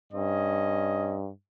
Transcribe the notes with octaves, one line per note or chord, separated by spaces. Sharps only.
G2 C#4 D#5